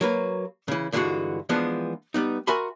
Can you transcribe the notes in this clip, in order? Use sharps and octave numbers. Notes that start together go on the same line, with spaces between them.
F#3 A#3 B4
C#3 E3
G2 D3 E3 G#3 F4 F#4
E3 F3 G#3 B3 D4
G3 B3 D#4
F#4 A#4 E5 G#5 B5 C6